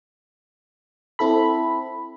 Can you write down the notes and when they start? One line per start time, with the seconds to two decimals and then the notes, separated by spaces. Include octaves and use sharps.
1.19 C4 E4 A4 B5